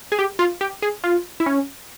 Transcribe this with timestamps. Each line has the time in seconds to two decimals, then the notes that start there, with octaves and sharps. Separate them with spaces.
0.12 G#4
0.19 G4
0.39 F4
0.61 G4
0.82 G#4
1.04 F4
1.40 E4
1.46 C#4